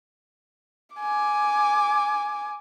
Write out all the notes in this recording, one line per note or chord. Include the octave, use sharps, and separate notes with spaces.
G#5 D6